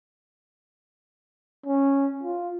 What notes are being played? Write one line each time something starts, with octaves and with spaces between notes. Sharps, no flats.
C#4
F4